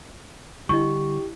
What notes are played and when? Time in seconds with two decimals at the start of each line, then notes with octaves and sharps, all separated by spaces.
0.69 D3 G3 D4 E4 G4 D#5 C#6